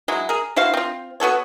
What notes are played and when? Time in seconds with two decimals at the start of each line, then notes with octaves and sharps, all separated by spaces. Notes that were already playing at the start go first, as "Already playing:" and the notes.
0.08 F#3 G#3 E4
0.29 G#4 A#4
0.56 E4 F#4 C5 F5
0.74 C4 F4
1.20 B3 F#4 A4 C#5